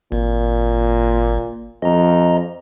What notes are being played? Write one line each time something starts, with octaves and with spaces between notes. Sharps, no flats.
G#1 A#2
F2 D#5 A#5